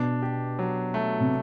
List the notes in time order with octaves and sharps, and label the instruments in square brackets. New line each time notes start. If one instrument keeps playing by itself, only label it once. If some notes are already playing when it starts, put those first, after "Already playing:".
Already playing: [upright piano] B2 [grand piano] D4
[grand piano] G4
F#3
A3
[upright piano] C3